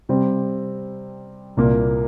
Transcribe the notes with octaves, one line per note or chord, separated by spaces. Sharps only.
C3 G3 C4
C2 A#2 A#3